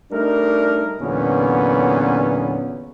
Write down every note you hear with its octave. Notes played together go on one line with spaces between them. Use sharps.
G3 A3 D4 D#4 A#4
E2 A#2 D3 F#3 B3 C#4